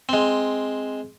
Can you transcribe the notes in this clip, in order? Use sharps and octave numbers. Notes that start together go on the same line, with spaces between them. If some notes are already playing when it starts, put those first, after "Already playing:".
G#3 C4